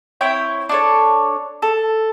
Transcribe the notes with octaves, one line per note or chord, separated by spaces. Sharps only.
C4 E4 C#5 G5
D4 A4 C#5
A4